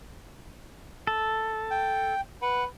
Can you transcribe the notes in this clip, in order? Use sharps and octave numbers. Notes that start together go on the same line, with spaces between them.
A4
G5
B4 F#5